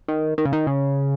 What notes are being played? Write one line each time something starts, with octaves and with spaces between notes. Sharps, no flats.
D#3
D#3
C#3
D#3
C#3